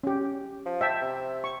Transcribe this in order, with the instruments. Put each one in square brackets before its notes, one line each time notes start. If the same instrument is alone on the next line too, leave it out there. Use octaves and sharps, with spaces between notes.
[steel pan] C#4 G4
[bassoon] F3
[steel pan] E5 G5 A5
[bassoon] C3
[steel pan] C#6